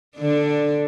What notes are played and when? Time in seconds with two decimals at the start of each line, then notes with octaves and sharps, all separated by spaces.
0.16 D3 D4